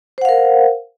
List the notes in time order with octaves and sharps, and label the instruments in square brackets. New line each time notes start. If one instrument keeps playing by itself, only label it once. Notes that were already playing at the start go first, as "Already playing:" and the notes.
[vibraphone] C5
F#5
F5
A#4